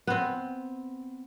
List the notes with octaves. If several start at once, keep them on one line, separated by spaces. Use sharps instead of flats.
B3 C4